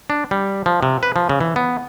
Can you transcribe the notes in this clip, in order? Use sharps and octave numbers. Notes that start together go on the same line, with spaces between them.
D4
G3
F3
C3
B4
F3
C#3
E3
B3